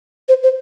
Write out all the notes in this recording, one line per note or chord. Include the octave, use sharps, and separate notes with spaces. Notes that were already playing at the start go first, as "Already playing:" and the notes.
C5
C5